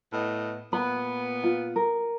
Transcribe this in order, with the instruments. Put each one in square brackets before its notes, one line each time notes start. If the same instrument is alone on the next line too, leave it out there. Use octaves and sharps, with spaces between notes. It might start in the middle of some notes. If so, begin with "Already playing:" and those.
[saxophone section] A2 B3 D#5
[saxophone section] A#2 B3 [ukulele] B5
[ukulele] F4
A#4